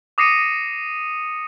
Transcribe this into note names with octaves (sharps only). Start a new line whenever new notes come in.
D6 D#6 A#6 C7 C#7 D#7